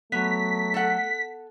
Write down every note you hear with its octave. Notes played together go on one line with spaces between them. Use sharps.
F#3 A3 B3 B6
A4 F#5